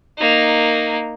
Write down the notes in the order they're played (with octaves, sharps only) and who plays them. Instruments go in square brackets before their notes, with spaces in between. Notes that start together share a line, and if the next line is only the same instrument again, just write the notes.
[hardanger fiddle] A#3 D#4